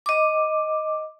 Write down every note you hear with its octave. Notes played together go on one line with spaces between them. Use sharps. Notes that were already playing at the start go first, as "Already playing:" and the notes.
D#5 D6